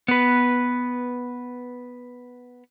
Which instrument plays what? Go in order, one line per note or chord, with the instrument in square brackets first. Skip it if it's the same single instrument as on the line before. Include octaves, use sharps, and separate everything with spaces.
[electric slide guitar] B3 B4